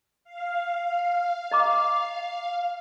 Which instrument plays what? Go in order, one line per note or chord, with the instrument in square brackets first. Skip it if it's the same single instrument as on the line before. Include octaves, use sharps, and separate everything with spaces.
[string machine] F5
[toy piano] D#5 A#5 D6